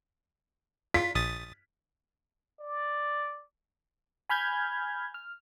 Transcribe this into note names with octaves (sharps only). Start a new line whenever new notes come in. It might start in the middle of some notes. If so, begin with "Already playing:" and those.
F4 B6
A#1 D#6 A6
D5
G#5 B5 F6 G6 G#6
F6